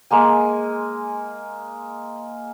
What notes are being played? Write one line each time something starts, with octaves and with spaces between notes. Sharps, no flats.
G#3 A#3 G#5